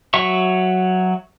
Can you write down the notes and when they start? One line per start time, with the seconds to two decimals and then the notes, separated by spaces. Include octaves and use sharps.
0.14 F#3 E5 C#6